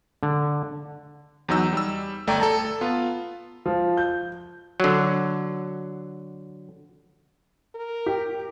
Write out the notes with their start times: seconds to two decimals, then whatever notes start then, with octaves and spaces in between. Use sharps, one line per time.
0.23 D3
1.49 E2 F#3 D#4 E6
1.73 G3 E6
2.27 G1 A3 D5 G5 A#5
2.40 A4 A5 A#5
2.81 B3 F4
3.66 F3
3.97 G6
4.80 D3 F#3
7.75 A#4
8.06 G4